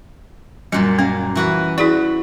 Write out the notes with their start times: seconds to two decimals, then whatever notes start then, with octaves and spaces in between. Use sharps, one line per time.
0.72 F#2 A#2 F#3 G3
0.99 A#3 C#4
1.35 E3 F#4 B4
1.78 E4 F#4 G#4 D5